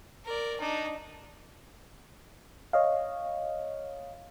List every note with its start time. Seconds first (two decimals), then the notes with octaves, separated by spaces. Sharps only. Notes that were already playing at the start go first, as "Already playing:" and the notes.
0.25 A#4 D5
0.60 D4 D#4
2.73 C#5 D#5 F5